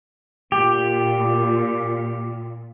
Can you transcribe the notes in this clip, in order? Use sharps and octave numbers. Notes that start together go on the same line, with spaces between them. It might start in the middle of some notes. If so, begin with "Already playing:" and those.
A#2 G4